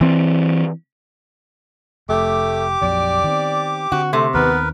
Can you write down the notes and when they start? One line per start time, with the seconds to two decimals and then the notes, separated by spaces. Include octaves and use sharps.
0.01 E3 C4
2.09 F1 A3 G4 D6
2.82 A#1 F2 F#3 D5
3.24 D#3 B3 C4
3.92 D3 C4 F#4
4.13 C3 A3
4.34 D#2 D#3 B3 C4 A#4 B4